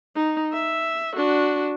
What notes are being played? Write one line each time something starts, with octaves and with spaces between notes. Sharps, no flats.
D#4
E5
D4 F#4